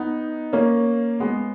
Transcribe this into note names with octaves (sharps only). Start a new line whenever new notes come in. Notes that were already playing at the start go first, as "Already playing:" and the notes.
Already playing: B3 D#4
A#3 C#4
G#3 B3